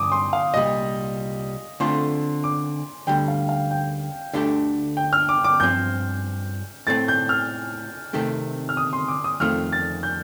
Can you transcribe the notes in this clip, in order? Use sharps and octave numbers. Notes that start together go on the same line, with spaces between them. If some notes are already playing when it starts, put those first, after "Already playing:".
Already playing: G2 F3 D6 D#6
C6
F5
C2 A#2 G3 D#5
D3 A3 C4 F4 C6
D6
D2 D3 G3 G5
F5
F5
G5
D2 D3 A3 D4 G4
G5
F6
D6
D6
G2 F3 C4 G6
A2 A3 C4 A6
G6
F6
C3 D#3 A3 C4 G4
F6
D#6
C6
D6
D#6
F2 D#3 A3 C4 F4 F6
A6
G6